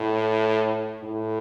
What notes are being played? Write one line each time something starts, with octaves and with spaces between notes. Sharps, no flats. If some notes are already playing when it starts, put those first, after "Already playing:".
Already playing: A2
A2